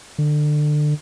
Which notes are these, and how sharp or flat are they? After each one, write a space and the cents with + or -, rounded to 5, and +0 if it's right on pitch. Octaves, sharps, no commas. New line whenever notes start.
D3 +25